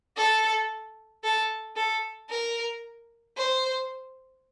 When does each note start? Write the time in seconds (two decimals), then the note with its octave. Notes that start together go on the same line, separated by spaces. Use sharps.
0.17 A4
1.24 A4
1.76 A4
2.30 A#4
3.37 C5